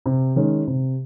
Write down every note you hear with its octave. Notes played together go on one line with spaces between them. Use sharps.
C3
D#3 G#3 C#4
C3